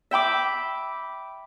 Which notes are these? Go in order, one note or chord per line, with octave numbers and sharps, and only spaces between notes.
E5 G5 B5 D6